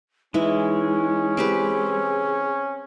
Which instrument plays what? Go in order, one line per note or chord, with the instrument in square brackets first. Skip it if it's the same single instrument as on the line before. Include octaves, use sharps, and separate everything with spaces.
[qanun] E3 E4 [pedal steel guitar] G#3 [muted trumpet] C#4 [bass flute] D#4
[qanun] C4 G4 B4 [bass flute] G#4